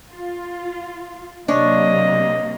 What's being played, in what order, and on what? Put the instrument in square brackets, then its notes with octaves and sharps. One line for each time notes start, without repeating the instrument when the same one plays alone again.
[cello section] F4
[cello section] C3 F#3 A#3 [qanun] D4 C#5 [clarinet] D#5